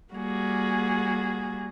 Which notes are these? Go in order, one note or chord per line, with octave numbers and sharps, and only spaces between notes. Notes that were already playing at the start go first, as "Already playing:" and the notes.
G3 A#3 F#4 G#4